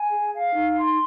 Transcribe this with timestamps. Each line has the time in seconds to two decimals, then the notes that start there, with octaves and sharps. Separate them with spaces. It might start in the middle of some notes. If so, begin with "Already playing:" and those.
Already playing: G#5
0.10 G#4
0.32 F5
0.54 D#4
0.77 C6